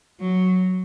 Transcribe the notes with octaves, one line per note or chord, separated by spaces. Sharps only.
F#3